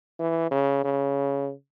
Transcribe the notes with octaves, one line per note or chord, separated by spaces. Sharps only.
E3
C#3
C#3